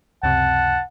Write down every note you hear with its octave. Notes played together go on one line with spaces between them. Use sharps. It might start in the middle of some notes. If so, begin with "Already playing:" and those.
C#2 F#2 C3 F#5 A5